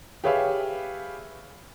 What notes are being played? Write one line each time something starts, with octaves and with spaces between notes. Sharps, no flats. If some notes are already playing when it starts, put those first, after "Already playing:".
G4 G#4 B4 C#5 E5 F5